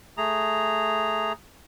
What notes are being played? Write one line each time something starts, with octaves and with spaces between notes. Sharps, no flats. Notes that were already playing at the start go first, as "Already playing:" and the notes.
A3 G#4 A#5